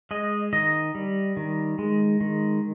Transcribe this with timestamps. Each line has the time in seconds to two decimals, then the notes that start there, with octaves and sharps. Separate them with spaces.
0.11 G#3 D#5
0.53 D#3 D#5
0.95 G3
1.37 D#3
1.79 G#3
2.21 D#3